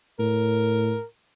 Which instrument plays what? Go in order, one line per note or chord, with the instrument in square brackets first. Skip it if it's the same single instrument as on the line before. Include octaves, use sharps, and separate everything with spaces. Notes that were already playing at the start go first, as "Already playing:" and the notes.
[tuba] A2 [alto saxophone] A#4